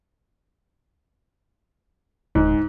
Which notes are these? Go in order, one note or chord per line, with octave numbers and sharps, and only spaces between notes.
D1 G#2